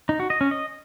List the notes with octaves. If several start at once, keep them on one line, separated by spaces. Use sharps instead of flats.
D#4
F#4
D#5
C#4
D#5